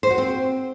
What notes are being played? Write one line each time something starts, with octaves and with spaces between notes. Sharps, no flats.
C5
F#4
C4